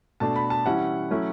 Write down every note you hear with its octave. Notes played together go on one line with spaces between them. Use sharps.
B2 A3 D4 A5
B5
A5
E3 G3 C#4 E4 F#5
F#3 A3 C#4 E4